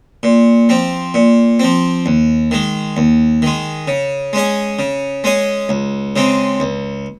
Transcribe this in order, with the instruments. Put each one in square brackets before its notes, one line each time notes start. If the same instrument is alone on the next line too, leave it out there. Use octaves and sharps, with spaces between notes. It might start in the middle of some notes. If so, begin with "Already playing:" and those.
[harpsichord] A#2
F3 C4
A#2
F3 C4
D#2
D#3 G#3
D#2
D#3 G#3
C#3
G#3 C#4 G#4
C#3
G#3 C#4 G#4
C#2
C#3 G#3 C4
C#2